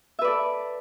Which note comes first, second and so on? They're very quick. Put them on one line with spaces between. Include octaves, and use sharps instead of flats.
E5 B4 D5 A4